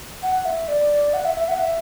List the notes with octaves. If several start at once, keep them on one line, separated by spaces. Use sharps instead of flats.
F#5
E5
D5
F#5
E5
E5
F#5
E5